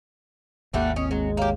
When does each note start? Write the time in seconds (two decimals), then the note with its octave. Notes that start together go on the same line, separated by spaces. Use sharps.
0.74 G#1 D#2 G3 A3 A#3 D4 F#5
0.96 C4 C#4 D#5
1.11 F#3 G#3
1.37 A#3 G4 C#5